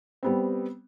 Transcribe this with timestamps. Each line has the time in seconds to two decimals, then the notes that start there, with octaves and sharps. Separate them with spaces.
0.23 G3 B3 C4